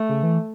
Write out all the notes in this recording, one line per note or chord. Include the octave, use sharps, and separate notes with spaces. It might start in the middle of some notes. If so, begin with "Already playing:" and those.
Already playing: A3
C#3
E3